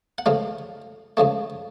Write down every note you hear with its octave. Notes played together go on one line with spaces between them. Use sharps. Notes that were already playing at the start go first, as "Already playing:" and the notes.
F#5
C#2 C#3 F3 A3 F5
C#2 C#3 F3 A3